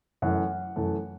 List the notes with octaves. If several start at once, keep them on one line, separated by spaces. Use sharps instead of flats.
F#2 E3 A3 F#5
F#2 E3 A3